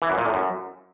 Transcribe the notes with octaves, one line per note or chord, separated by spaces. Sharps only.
E3
F#2
A#2
A2
F#2